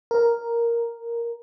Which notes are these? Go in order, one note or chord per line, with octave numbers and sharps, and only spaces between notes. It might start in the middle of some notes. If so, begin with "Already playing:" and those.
A#4